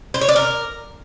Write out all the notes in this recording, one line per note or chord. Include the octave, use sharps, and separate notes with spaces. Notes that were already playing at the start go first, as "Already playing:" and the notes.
C5
C#5
D5
A#4